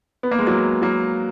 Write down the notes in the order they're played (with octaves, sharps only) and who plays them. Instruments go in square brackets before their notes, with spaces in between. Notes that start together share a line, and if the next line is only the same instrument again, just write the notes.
[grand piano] B3
A#3
G#3
F#3 A#3
F#3 A#3